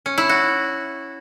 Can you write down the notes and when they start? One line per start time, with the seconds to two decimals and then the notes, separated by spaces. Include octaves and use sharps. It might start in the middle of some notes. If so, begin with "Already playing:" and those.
0.06 C#4
0.18 E4
0.29 F#4